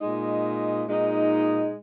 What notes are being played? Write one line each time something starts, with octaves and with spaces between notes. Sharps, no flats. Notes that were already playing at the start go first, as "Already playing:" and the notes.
A#2 G#3 D#4
A#2 G#3 D#4